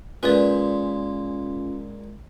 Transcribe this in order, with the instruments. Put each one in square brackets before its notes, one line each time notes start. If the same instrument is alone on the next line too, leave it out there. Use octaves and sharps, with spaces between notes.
[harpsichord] A#2 G#3 [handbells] C#4 F4 [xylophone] B4 D5